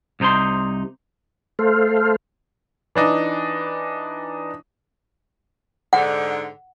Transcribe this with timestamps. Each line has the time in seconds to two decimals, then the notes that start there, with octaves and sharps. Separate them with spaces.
0.20 C2 C3 D#4 C5 C6
1.59 A3 A4 C5 F5
2.95 E3 D4 D#4
5.93 G#2 D3 F#5